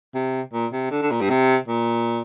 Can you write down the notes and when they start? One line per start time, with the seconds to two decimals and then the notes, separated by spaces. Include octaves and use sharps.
0.15 C3
0.53 A#2
0.73 C3
0.91 D3
1.02 D3
1.11 A#2
1.21 G2
1.30 C3
1.68 A#2